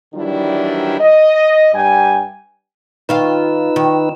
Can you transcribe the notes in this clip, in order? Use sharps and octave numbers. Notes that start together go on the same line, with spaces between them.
D#3 E3 F#3 G3 D4 E4
D#5
G2 G3 G5 G#5
D#3 D#4 F4 B4 F5 E6
D#3